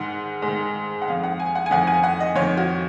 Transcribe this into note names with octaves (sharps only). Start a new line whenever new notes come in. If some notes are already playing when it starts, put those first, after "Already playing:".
Already playing: G#2 D#3 F#5
G#2
D#3
F#5
F2 D#3 F5
F#5
G#5
F#5
G#5
F2 D#3 F#5
G#5
F#5
D#5
F2 D#3 C#5
F#4